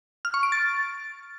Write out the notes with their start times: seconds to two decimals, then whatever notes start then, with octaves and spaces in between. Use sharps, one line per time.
0.25 F6
0.34 C#6
0.43 D7
0.52 A6